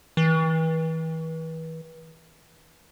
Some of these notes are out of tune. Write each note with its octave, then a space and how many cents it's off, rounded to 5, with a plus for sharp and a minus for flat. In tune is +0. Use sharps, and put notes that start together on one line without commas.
E3 -35